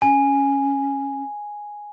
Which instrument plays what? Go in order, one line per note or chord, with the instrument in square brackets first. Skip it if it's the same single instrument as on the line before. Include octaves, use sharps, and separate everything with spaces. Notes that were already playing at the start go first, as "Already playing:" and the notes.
[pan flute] C#4 [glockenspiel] G#5